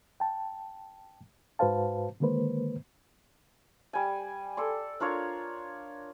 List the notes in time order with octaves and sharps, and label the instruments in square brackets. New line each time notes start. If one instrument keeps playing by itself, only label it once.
[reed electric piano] G5 A5
G#2 F#4 B4 C5 F5 A5
D3 D#3 G#3 A#3 B4 C5
[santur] G3 G#5
A4 D5 C6
D4 F4 A#4 C#5